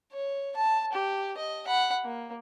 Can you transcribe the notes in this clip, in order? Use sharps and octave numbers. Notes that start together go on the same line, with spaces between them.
C#5
A5
G4
D#5
F#5 B5
A#3